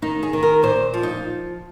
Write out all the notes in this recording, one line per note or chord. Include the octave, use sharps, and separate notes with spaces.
D#3 D#4
G#4
D#3
A#4
A#2 C5
F3
D#4